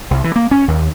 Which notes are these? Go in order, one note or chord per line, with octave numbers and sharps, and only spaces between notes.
C2
E3
A#3
C#4
D#2